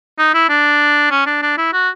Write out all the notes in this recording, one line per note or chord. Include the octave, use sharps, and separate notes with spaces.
D#4
E4
D4
C#4
D4
D4
E4
F#4